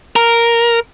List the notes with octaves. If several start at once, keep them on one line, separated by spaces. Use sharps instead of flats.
A#4